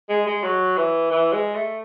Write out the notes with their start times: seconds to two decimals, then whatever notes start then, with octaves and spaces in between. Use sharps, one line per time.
0.09 G#3
0.27 G#3
0.44 F#3
0.77 E3
1.10 E3
1.33 G#3
1.55 A3